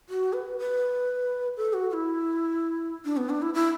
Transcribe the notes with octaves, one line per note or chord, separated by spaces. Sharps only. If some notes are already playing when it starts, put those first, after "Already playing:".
F#4
B4
B4
A4
F#4
F#4
E4
D4
B3
D4
E4
E4